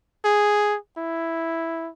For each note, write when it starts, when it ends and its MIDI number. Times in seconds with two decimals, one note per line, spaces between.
0.25 0.77 68
0.97 1.90 64